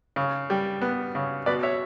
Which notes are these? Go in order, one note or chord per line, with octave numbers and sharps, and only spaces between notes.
C#3
G3
B3
C#3
B2 B4 D5
C#5 E5